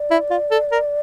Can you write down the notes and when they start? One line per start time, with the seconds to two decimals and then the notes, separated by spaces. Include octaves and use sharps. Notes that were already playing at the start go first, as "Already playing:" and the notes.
Already playing: D5
0.11 E4
0.30 F4
0.51 A4
0.72 A#4